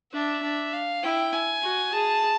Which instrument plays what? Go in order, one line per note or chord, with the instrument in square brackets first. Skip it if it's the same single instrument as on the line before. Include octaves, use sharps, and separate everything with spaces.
[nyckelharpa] D4 [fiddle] E5
[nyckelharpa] D4
[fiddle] F5
[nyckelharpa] E4 [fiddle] G5
[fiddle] G#5
[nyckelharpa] F#4
[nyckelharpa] G#4 [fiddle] A5